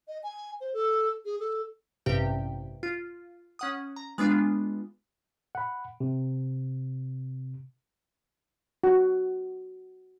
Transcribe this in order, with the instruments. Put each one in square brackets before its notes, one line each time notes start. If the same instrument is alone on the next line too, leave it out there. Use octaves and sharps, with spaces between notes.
[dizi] D#5
G#5
C5
A4
G#4
A4
[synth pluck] A1 G2 C3 G4 G5
F4
C#4 F#5 D#6
A#5
G#3 B3 D4 F4
[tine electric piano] F#5 B5
C3
[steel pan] F#4